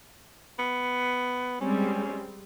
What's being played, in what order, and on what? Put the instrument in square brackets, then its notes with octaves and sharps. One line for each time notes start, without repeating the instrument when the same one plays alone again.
[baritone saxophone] B3
[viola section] G3 G#3 C4 [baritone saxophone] C#4